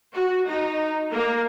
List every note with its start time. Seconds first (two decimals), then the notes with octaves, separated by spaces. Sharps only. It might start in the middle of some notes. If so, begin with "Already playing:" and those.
0.13 F#4
0.49 D#4
1.13 A#3